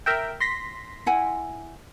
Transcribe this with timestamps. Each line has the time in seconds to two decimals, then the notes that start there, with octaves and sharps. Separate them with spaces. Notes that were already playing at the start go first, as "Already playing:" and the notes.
0.06 A#4 E5 G5
0.40 C6 A#6 B6
1.06 E4 F#5 G#5